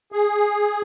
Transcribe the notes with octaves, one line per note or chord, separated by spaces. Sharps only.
G#4